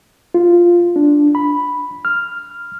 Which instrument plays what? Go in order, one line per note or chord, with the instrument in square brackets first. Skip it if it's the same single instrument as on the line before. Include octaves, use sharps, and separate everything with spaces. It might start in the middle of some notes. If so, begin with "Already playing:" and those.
[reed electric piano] F4
D4
B5
F6